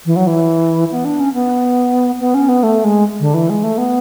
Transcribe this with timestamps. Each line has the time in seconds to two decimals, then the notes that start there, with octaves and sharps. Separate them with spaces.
0.06 E3
0.16 F#3
0.27 E3
0.91 B3
1.05 D4
1.20 C#4
1.34 B3
2.20 B3
2.34 C#4
2.49 B3
2.63 A3
2.84 G#3
3.20 D3
3.34 E3
3.49 G#3
3.63 A3
3.78 B3